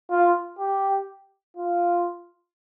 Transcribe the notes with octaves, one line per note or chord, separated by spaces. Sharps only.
F4
G4
F4